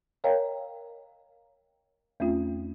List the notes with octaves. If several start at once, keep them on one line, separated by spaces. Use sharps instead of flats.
A#4 C#5 D#5 F5 G5 A#5
E2 A3 C4 C#4 F4